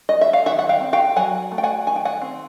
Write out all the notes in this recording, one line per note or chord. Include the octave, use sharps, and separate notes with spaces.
D#5
E5
F5
D#3 E5 F#5
F#5
F5 G5
C4
F5 G5
F#3 F#5 G#5
A3
G5
F#5 G#5
D#3 G#5
G5
F#5 G#5
C4